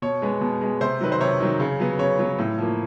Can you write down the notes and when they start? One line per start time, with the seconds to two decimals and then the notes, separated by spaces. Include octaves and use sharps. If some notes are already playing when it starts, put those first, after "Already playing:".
0.02 B2 C#5
0.22 G#3 B3
0.41 B2
0.61 G#3 B3
0.81 C3 C5
1.01 D#3 F#3 B4
1.12 C5
1.21 C3 C#5
1.40 D#3 F#3
1.60 C#3
1.80 F#3 B3
1.99 C#3 C#5
2.19 F#3 B3
2.38 A2
2.59 F3 A#3